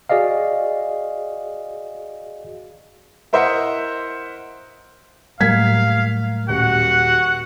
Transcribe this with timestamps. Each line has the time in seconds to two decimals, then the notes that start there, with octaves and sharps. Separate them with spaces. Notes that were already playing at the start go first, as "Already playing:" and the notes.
0.09 F#4 G#4 D5 D#5 F5
3.33 E4 A#4 C5 D#5 E5 F#5
5.40 A2 F#3 G3 A#3 F5 G#6 B6
6.49 D#1 F#4 F#5